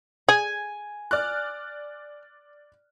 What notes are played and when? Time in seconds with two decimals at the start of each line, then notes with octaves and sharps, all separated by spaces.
0.29 G#4 G#5
1.11 D5 F6 F#6